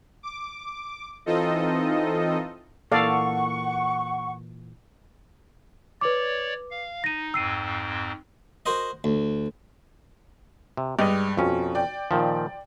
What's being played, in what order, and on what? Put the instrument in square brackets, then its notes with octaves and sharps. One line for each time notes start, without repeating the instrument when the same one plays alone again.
[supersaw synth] D6
E3 C4 D#4 F4 A4 D#5
[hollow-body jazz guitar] A#2 E3 A#3 [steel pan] A4 D5 F5 [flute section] F#5 C#6
[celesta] B4 D6 [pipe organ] C#5 D5
[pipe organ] F5
[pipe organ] D#4 [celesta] A#6 D#7
[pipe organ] F2 G#2 C4 [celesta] E6 C7 D#7
[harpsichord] F#4 A#4 C5 D#5
D2
[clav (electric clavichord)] C3
[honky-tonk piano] G2 G3 G#3 [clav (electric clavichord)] D5 D#5
[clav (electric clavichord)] F2 C#4 [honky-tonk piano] B2
[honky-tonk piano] D5 G5
[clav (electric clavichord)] A#2 D#3 F3